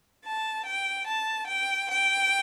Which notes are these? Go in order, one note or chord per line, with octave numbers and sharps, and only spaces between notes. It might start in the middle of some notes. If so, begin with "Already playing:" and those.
A5
G5
A5
G5
G5